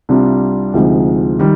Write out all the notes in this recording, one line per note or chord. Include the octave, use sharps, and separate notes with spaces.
C2 C3 G3 D4 F4
D2 C3 F3 G#3 D#4
D#3 G3